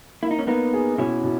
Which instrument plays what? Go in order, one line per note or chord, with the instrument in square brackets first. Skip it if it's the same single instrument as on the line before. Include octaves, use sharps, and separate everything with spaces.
[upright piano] A#3 [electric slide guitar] E4
[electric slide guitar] D#4
C#4
[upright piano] A#3 [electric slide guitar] B3 D#4
[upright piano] G#4
[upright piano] B2 [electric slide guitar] C#4 E4
[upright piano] B2